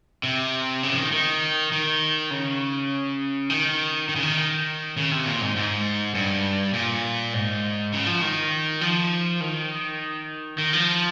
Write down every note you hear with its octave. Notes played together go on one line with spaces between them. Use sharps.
C3
C#3
F3
D#3
D#3
D#3
C#3
D#3
D#3
C#3
D#3
C#3
C3
A#2
G#2
G#2
G2
A#2
G#2
C#3
F3
D#3
F3
D#3
D#3
F3